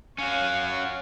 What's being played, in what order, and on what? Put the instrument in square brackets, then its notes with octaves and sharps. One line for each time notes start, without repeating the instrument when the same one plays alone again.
[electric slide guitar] C#4 F#4 [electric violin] C#5 F5